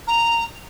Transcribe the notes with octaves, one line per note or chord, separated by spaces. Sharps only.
A#5